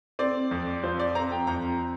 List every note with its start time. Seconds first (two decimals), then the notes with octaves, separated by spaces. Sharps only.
0.19 C4 D5
0.51 F2
0.83 F3 C5
0.99 D5
1.15 C4 A#5
1.32 G5
1.47 F2 A#5